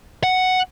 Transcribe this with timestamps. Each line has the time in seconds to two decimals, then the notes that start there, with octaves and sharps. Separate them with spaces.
0.23 F#5